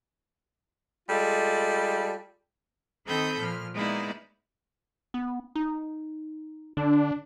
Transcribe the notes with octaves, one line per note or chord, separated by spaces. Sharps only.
G3 G#3 F4 A4
D#3 C4 A4 B5 D#6 G6
A#2 F3 F6
G#3 A#3 B3 D#4 E4 D5
B3
D#4
D3 D4